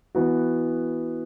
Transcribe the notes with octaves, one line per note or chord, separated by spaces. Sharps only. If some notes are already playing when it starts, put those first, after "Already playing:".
E3 B3 F#4